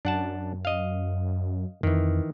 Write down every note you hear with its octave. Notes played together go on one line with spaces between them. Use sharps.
F#2 D4 F#5 A5
D#5 F5
F2 D#3 E3